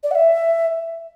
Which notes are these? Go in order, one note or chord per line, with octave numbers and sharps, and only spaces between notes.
D5
F#5
E5